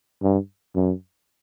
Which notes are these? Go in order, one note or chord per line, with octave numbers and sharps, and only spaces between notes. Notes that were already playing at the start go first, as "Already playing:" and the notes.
G2
F#2